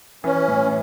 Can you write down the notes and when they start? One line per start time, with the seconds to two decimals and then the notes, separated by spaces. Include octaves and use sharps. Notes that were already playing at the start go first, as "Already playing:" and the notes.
0.24 E3 C#4
0.48 A2